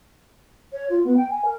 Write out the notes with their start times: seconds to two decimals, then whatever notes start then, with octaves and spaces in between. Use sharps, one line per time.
0.73 C#5
0.90 F4
1.04 B3
1.17 G5
1.30 G#5
1.45 A#4